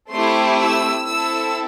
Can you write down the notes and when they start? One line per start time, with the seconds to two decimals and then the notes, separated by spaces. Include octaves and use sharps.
0.11 A3 C4 E4 G4 C6
0.60 E6
1.07 C4 E4 A4 E6